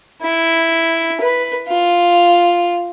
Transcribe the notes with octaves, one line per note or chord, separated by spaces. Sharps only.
E4
B4
F4